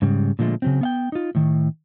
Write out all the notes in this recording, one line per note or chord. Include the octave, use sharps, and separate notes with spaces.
G#2 C#3 G3
A#2 D3 F3 G#3 A3
C#3 F#3 C4
B3 F5 G5
D#4 F4
A2 D#3